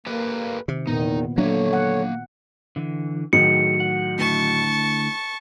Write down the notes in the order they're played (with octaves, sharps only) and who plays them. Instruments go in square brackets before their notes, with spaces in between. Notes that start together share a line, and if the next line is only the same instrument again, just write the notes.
[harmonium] A#3 [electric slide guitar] G4 A4 B4
[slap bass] C3 [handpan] D#3
[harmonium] E2 D#3 [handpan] A#2 B3 [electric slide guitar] D#4
[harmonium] D3 C#5 [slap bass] F#3 D4 [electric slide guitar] A#3 E5
[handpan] F#5
[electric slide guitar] D3 E3
[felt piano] A2 D#3 F#3 [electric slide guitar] G#4 [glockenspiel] C#7
[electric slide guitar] F#5
[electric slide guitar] D3 A3 E4 [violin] A5 C#6